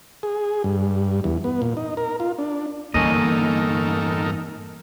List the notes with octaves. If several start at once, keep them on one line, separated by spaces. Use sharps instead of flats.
G#4
G2
E2
B3
A#2
D#4
A#4
F4
D4
E2 G2 A#3 C#4 D#4 A4 A#4 D#5